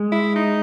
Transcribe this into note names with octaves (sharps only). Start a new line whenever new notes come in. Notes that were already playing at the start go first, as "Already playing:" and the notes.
Already playing: G#3
E4
D#4